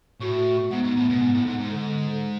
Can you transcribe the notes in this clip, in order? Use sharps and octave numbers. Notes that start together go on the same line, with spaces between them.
A2 F#4
G#2 B3
G#2
A2
B2
G#2
A2
G#2
G#2
D3